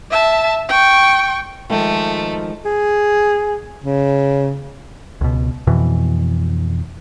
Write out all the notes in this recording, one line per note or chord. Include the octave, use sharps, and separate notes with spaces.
E5 A5
G5 C#6
D#3 F3 G#3 A3
G#4
C#3
C#2 B2
F2 B2 E3